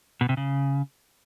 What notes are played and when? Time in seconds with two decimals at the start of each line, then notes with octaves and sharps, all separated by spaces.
0.21 B2
0.29 C3
0.37 C#3